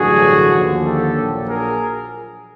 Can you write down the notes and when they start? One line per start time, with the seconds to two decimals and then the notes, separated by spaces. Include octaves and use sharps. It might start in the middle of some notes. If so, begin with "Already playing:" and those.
Already playing: A1 G2 D3 F#3 F#4 G#4
0.53 D#2 D3 F3
0.83 G4 A4
1.15 A#1 A#2 F#3
1.46 G#4 A#4